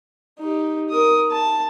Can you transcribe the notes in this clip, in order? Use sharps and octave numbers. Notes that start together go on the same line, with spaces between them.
D#4 G4
A#4 D#6
A5